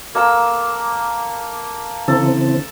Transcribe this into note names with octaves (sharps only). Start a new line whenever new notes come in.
A#3 A4 E6
C#3 E3 C4 A4